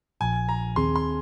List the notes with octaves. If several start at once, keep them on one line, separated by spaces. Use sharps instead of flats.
A#1 A#2 F3 G#5
A#5
D#2 D#3 C4 G#4 C6
C6